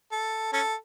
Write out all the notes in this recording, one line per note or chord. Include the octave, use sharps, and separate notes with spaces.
A4
C#4 A4